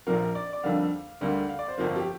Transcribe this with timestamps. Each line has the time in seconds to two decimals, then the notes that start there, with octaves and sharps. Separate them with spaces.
0.07 A#1 A#2 F3 A#3 A#4
0.35 D5
0.53 D5
0.63 F2 D3 G3 A#3 F5
1.21 D2 D3 G3 A#3
1.49 F5
1.59 D5
1.68 C5
1.78 G1 F2 F3 A#3
1.96 G4